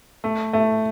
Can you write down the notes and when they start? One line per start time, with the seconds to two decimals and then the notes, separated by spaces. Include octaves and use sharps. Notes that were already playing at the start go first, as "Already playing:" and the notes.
0.24 A3
0.53 A3